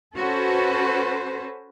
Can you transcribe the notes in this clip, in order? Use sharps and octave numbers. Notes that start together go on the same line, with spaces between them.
C#4 F#4 A4 B4 C5